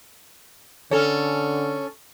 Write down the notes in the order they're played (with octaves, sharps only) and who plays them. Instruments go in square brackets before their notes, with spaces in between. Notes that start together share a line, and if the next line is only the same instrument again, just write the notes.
[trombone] D3 [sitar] C#4 A4